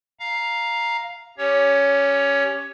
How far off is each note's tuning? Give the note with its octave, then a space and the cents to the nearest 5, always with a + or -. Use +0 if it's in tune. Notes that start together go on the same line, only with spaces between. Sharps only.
F5 +0 A#5 +5
C#4 +0 G4 +0 C#5 +15